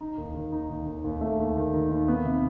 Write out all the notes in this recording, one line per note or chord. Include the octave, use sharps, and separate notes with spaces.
D#4
D#2
D#3
D#4
D#2
D#2
D#2
A3
D#2
D#3
D#3
D#2
B3
C3